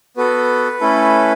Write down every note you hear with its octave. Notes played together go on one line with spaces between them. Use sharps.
B3 F#4 A4 B4
A3 C#4 E4 A4